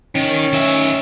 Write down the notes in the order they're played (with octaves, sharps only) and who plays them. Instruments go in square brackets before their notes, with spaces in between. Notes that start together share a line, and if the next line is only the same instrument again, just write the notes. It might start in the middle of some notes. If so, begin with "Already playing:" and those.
[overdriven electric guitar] D#3 [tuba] C#4
[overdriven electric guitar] D#3 E5